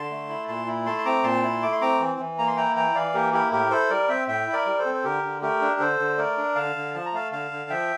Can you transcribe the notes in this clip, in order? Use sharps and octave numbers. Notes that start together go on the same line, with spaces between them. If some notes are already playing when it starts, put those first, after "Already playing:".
Already playing: D3 A5 C6
A3
E4
A#2 A5 C6
E4
A3 A5 C6
C6
C4 A#5 D6
A#2 A5 C6
E4
A3 D6
C6
C4 A#5 D6
E3
E3
A#3 A#5
C6
E4 G5 A#5
E3 G5 A#5
E3 D5 F5
A#3 G4 A#4
E4 G4 A#4
A2 G4 A#4
E4 A4 C5
G3 A#4 D5
C4 E5 G5
A2 E5 G5
E4
A#4 D5
G3
A4 C5
C4
C5
D3 G4 A#4
D3
A3 G4 A#4
D4
D3 A4 C5
D3
A3 A#4 D5
D4
D3 F5 A5
D3
F3 A5
A#5
A3 F5 A5
D3 F5 A5
D3
F3 E5 G5